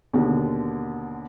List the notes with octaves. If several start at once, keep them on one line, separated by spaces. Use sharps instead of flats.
D#2 B2 D3